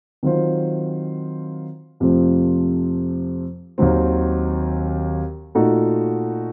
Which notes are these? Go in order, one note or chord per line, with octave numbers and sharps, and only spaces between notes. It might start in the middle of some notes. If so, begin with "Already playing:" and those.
D#3 F#3 C4 F4 C5
F2 C3 F3 A3 C4
D#2 D#3 F#3 C4
A#2 A3 D#4 F#4 A4